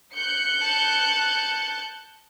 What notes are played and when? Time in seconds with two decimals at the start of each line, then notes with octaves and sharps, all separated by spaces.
0.15 F#6 G6 C#7
0.62 A5